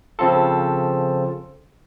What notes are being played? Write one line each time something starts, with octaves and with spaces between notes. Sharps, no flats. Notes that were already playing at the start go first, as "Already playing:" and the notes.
C#3 F3 C4 F4 A4